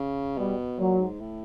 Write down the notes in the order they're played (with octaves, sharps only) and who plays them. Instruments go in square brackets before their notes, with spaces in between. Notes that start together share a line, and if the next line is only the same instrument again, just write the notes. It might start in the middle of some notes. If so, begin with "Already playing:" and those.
Already playing: [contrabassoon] C#3
[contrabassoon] B2 [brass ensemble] G3
[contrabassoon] A#2 [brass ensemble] F#3
[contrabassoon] G#2
A2